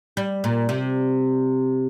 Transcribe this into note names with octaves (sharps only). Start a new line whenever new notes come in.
G3
A#2
C3